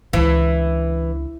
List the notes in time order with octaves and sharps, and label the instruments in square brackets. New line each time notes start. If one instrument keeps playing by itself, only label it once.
[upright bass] C#2 D3 [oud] E3